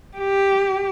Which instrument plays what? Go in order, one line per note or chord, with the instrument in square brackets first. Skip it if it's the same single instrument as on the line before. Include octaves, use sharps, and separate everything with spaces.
[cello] G4